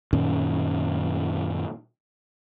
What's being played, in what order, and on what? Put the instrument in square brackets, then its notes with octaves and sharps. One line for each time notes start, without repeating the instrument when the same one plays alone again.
[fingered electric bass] F#2 A#2 D#3 C#4